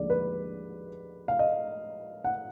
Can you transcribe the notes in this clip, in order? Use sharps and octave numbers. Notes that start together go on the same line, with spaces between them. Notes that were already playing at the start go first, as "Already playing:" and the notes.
Already playing: D#2 D3 F3 G#3 D5
B4
F5
D#5
F#5